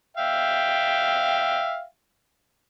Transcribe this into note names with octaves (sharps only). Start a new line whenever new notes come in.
E5 F5 G5